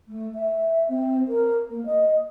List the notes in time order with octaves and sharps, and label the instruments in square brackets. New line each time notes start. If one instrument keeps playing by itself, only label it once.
[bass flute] A3
E5
C4
A#4
A#3
D#5